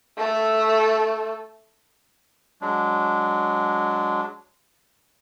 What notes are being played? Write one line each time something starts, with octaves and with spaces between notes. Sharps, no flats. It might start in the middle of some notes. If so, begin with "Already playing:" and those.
A3 A4
F#3 G#3 D4